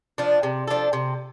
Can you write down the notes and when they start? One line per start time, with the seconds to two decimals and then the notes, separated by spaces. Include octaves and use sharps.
0.18 F3 D4
0.43 C3
0.68 F3 D4 A4
0.93 C3